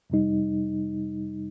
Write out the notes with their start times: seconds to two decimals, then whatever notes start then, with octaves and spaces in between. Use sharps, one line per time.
0.10 F2 C3 G3 D#4